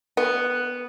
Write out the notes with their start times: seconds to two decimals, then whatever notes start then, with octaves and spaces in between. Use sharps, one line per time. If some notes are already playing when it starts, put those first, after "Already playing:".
0.17 B3